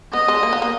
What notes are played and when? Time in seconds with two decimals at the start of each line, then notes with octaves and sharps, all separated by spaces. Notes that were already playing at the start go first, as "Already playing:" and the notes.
0.13 B3 D#5
0.28 G#3
0.43 A#3
0.53 B3
0.62 A#3